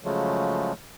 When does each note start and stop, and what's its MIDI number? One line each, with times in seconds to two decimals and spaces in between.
0.04 0.73 49
0.04 0.73 53
0.04 0.73 54
0.04 0.73 56
0.04 0.73 57